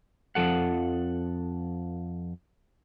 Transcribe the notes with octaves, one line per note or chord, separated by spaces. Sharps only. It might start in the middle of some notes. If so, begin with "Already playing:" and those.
F2 F3 A4 F#5